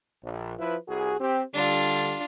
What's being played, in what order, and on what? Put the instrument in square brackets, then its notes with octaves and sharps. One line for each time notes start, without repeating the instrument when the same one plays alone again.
[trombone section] A#1
F3 E4 B4
C2 F#4 G#4
C4 G4
[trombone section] D3 G3 [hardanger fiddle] D4 F4